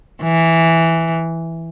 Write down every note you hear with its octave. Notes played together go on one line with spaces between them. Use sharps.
E3